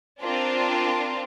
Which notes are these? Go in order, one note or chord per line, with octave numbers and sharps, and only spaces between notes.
C4 D4 F4 A#4